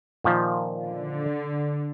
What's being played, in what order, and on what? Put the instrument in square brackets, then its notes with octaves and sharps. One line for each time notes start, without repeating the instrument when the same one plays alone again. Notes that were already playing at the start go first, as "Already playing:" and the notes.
[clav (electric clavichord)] A#2 D#3 F3
[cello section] D3